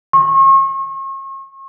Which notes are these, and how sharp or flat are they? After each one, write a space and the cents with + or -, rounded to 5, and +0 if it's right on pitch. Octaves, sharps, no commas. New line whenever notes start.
C#6 -40